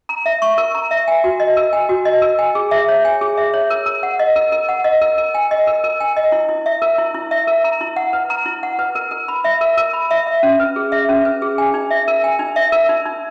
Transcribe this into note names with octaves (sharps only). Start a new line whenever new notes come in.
A#5
E5
C#6
A#4
A#5
E5
G#5
F#4
D#5
A#4
G#5
F#4
D#5
A#4
G#5
G#4
E5
C#5
G#5
G#4
E5
C#5
A#4
A#4
F#5
D#5
A#4
A#4
F#5
D#5
A#4
A#4
G#5
D#5
A#4
A#4
G#5
D#5
E4
E4
E5
A#4
E4
E4
E5
A#4
A#5
E4
F#5
B4
A#5
E4
F#5
B4
A#4
A#4
B5
E5
A#4
A#4
B5
E5
E5
C#4
B4
G#4
E5
C#4
B4
G#4
G#5
D#4
E5
A#4
G#5
D#4
E5
A#4
D#4
D#4